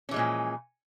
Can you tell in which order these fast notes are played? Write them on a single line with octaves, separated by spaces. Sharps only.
C#4 E3 G#3 A#2 F3